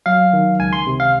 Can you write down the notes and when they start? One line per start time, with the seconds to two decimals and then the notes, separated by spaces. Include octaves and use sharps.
0.06 F#3 F5
0.33 D#3
0.59 C#2 G#5
0.73 C6
0.87 C3
1.00 F5